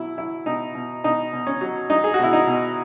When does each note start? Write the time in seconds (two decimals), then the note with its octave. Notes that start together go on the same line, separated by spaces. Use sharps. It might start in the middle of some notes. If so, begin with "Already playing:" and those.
Already playing: B2 F#3 E4
0.18 F#3 E4
0.46 B2 D#4
0.75 B2
1.04 B2 D#4
1.33 B2
1.47 C#4
1.61 F#3
1.90 F#3 D#4
2.04 G#4
2.14 F#4
2.19 B2 E4
2.33 D#4
2.47 B2